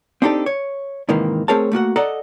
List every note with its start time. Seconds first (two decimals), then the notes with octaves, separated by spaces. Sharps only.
0.22 C4 D4 D#4 G4 A4
0.46 C#5
1.09 G#2 C3 D#3 E3 A#3
1.48 A3 C4 G#4 A#4 C#5 A5
1.72 A3 A#3 F#4 F#5
1.96 A4 D5 D#5 F#5 A#5